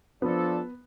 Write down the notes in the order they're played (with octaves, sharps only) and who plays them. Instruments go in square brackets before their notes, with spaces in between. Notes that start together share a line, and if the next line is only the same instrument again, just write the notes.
[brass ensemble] F3 D4 A4 [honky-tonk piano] B3